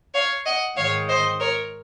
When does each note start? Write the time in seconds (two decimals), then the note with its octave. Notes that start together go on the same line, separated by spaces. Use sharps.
0.14 C#5 F5
0.45 D#5 F#5
0.77 G#2 D#3 G#3 C#5 F5
1.08 C5 D#5
1.40 A#4 C#5